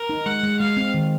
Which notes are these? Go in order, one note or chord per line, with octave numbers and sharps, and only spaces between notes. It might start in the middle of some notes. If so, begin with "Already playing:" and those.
Already playing: A#4
D#4
G#3 F#5
G#3
G#3 F5
C4
D#3